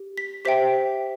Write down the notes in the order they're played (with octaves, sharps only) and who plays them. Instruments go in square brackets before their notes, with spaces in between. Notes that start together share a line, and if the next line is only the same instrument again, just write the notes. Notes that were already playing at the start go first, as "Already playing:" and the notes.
Already playing: [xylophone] G4
B6
G4 C5 E5 G5 B6